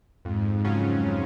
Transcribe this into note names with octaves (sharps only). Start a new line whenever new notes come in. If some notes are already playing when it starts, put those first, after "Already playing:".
F2 G#2
G#2 C#3 F#3 C#4 F4